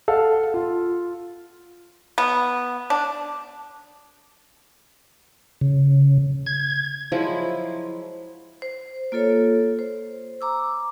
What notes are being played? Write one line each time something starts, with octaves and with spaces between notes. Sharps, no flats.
A4 F5 F#5
F4
B3
D4
C#3
G#6
F3 F#3 G#3 E4
C5
A#3 F4 A4 C#5
C5
A#5 D6 E6